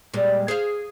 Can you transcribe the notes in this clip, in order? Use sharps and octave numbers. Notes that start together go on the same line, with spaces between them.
A#2 G3 G#3
G#4 C5 F5